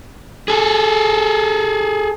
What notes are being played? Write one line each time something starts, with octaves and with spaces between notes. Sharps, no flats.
G#4 A4